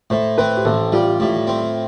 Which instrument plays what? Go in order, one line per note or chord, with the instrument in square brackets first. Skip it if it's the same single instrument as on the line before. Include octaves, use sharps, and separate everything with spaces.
[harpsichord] A2 [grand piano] C5
[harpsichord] C4 [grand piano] B4
[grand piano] G4
[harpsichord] A1 [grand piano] A4
[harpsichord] G3 [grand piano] F4
[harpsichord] A2
C4